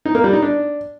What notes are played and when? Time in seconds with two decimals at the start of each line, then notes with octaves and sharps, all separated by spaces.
0.05 D#4
0.15 A#3
0.24 G3
0.33 D#4
0.42 D4